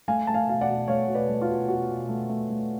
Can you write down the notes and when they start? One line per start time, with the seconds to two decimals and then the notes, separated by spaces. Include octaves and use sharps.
0.08 A3 F5 G#5
0.27 A3 A5
0.34 F5 G#5
0.47 B2 F5
0.61 D5 F#5
0.68 B2
0.88 A3 C#5 F5
1.08 B2
1.15 B4 D5
1.29 A3
1.42 F4
1.48 B2
1.68 B2 F#4
1.89 B2
2.09 A3
2.29 A3
2.50 A3